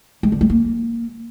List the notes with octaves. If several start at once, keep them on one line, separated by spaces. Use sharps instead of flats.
G#3
D3
G#3
A#3